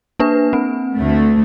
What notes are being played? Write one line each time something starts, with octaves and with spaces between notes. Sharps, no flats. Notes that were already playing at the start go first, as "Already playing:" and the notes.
A#3 D4 B4
C4
D2 A3